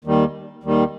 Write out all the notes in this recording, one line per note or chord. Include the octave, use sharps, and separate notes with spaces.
D#2 D#3 G3
D#2 D#3 G3